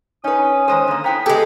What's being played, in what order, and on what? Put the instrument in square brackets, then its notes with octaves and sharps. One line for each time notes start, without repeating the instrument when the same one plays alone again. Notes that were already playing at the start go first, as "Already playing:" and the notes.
[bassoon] C#4 [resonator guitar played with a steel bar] D#4 B4 [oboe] D#6
[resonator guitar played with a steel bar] D#3 G#3 C5 [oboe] D#6
[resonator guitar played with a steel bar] D3 A#3
[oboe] B3 [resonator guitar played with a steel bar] E4 G5 A#5
[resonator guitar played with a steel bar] C#3 B3 [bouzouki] G#3 A4 [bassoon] G4 [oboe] G#5